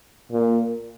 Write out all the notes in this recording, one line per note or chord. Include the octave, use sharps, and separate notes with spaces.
A#2